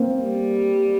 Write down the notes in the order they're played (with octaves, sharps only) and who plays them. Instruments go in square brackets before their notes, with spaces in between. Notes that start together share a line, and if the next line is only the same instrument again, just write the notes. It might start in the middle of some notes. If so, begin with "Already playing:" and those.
Already playing: [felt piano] A#3 C4
[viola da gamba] G3